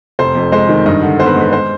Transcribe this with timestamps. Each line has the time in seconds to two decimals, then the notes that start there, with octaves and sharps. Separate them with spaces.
0.19 F1 C5
0.35 F2
0.52 G#3 C5
0.69 D#3
0.86 G2 D#5
1.02 D3
1.19 B3 C5
1.26 B4
1.36 G#3 B4
1.53 C5